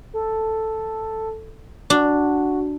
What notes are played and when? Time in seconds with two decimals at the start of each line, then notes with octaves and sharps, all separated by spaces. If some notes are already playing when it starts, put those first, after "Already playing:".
0.14 A4
1.90 D4 F#4